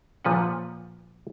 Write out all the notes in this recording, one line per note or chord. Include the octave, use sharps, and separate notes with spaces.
A#2 F3 B4 F#5